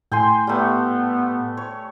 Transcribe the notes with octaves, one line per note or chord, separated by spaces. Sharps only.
A2 G5 G#5 C6
G3 A3 B3
C#5